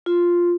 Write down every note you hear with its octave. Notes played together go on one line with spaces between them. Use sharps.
F4